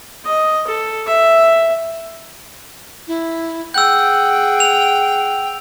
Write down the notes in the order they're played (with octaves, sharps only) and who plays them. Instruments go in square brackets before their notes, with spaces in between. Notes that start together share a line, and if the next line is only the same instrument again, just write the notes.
[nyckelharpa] D#5
A4
E5
[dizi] E4
[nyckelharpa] G#4 F#5 [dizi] G5 [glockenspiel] E6 G6
[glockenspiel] F7